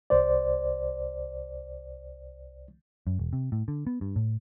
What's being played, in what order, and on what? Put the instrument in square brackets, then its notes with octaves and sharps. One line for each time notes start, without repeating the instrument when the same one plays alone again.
[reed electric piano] C2 C5 D5
[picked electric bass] F#2
E1
C3
A2
D3
B3
G2
A2